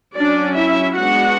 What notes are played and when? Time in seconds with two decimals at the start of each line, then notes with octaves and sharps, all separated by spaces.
0.16 F#3 C#4 D4 D5
0.56 E4 E5
0.97 G#3 B3 D4 F#4 F#5